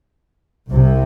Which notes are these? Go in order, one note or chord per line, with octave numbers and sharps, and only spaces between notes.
C2 C3